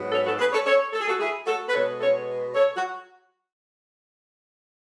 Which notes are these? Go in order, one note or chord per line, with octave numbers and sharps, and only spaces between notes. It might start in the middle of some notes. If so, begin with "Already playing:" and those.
Already playing: G#2 F#3 B3
A4 C#5
F#4 A4
G#4 B4
A4 C#5
A4 C#5
A4
G#4
F#4 A4
E4 G#4
F#4 A4
B4
B2 G#3 B3 A4 C#5
A4 C#5
A4 C#5
F#4